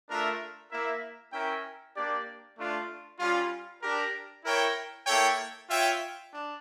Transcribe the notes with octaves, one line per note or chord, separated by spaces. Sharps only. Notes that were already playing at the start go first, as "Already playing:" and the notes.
A3 D4 F4 A#4 E5
A#3 E4 A#4 E5
C#4 E4 A#4 E5 G5
A#3 D4 G4 D5
A3 D4 F4
G3 C#4 F4
D4 G4 A#4
E4 A#4 C#5 G5
A#3 E4 A4 C#5 G5
F4 C#5 E5 G5
D4